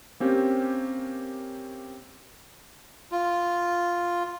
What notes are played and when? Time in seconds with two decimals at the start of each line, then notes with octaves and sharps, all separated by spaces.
0.20 A#3 C4 C#4 G4
3.12 F4